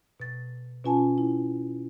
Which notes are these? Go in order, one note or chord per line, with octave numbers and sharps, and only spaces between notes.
B2 A6
B2 C#4 F4 G#5 A5
E4